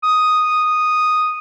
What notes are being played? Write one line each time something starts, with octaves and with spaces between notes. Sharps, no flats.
D#6